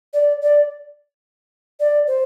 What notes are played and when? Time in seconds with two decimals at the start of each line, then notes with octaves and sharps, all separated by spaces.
0.13 D5
0.42 D5
1.80 D5
2.07 C5